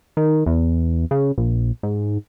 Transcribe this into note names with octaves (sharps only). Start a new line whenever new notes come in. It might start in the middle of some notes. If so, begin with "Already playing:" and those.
D#3
E2
C#3
A#1
G#2